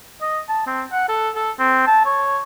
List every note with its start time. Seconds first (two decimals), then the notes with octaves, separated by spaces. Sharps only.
0.22 D#5
0.49 A5
0.67 C4
0.92 F#5
1.09 A4
1.36 A4
1.59 C4
1.87 A5
2.06 C#5